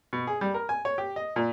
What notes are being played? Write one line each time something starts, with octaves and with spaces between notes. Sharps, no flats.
B2
G#4
G3
A#4
G#5
C#5
G4
D#5
A#2